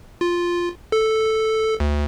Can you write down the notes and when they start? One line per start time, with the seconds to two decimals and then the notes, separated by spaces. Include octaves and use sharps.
0.21 F4
0.92 A4
1.80 D2